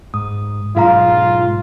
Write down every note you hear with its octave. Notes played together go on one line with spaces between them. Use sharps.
G#2 D#6
G#2 B2 F#3 F4 G#4 F5 A#5